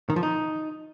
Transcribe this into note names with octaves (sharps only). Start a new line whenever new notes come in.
D#3
F3
D#4